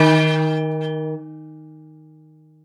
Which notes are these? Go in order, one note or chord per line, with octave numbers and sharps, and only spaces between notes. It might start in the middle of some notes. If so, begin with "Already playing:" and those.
Already playing: D#3